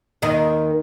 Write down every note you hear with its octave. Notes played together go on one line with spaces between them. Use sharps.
D#2 D#3 D#5